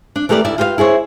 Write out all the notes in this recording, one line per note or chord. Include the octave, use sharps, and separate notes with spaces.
D4
E3 A3 G4 A#4 D5
D2 E4 D5 E5
F4 G4 B4 D#5 F5
E4 G#4 C5 C#5